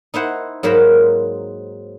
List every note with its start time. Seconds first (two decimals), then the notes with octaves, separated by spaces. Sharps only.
0.14 D#4 E4 C5 F#5
0.63 G#2 F#3 A#3 A#4 C5 B5